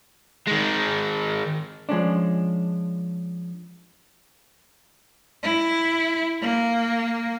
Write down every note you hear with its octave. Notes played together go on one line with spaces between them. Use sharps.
D#3 G#3
F3 G#3 C#4 D4
E4
A#3